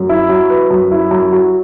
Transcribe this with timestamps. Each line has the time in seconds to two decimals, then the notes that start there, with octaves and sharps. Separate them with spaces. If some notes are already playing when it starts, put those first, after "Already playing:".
Already playing: F#2
0.09 E4
0.29 F#3
0.50 B4
0.70 F#2
0.91 E4
1.11 F#2
1.32 F#3